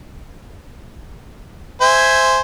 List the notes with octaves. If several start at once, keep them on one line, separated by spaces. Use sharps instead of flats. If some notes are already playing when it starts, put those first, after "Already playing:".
C5 E5 G#5